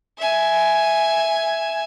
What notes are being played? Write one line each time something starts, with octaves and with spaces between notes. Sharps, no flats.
E5 G#5